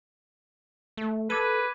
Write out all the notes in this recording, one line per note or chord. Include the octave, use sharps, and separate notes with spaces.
A3
A4 B4 D6 G#6 D#7